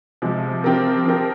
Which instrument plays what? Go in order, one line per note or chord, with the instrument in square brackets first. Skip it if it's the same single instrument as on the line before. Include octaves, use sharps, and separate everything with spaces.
[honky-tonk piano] C3 F3 G#3
F3 C4 G4 A#4
F3 C4 G4 A#4